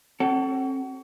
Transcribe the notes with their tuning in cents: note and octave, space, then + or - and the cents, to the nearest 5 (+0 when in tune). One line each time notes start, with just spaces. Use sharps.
C4 +40 F#4 +30 A4 +0